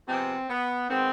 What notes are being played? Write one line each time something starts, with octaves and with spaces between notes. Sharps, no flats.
C3 F3 G#3 B3 C4
B3
D#3 G#3 B3 C4